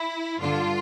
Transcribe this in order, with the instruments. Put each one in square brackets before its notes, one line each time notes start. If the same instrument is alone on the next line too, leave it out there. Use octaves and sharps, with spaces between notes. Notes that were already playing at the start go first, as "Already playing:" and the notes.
Already playing: [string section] E4
G2 D3 F4